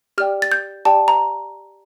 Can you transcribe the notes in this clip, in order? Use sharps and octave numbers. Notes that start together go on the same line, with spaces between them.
G4 D5 G5 F6
A6
G6
G4 D5 G5 A5
A#5